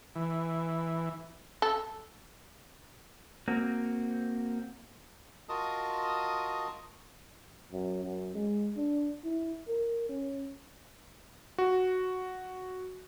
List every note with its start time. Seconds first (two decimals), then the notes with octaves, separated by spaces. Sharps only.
0.15 E3
1.62 A4
3.48 A#3 C4 F#4
5.49 F4 F#4 A#4 D#5 A5 D#6
7.72 F#2
8.04 F#2
8.34 G#3
8.76 D4
9.24 E4
9.68 A#4
10.09 C#4
11.58 F#4